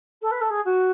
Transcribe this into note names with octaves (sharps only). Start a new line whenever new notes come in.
A4
B4
A4
G#4
F#4